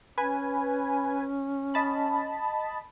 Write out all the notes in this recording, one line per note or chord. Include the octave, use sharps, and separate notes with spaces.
C#4 B4 G#5
D#5 A5 B5